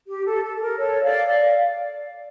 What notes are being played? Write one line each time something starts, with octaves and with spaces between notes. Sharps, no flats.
G4
A4
A4
A4
A#4
A4 C#5
D5 F5
D5 F5